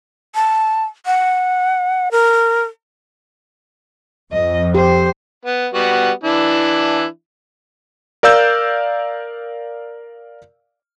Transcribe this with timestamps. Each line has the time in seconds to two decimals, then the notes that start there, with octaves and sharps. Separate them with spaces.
0.35 A5
1.06 F#5
2.11 A#4
4.32 F2 D#5
4.75 G4 C5
5.45 B3
5.74 G3 B3 F#4
6.24 E3 D4 E4
8.23 A#4 D5 F5 E6 G6